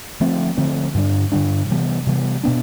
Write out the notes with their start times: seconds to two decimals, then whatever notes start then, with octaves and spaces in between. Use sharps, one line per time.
0.20 D3 F3 A3 C4
0.57 D3 F3 A3 C4
0.94 G2 D3 G3 D4
1.32 G2 D3 G3 D4
1.70 C3 E3 G3 B3
2.06 C3 E3 G3 B3
2.43 B2 B3 D4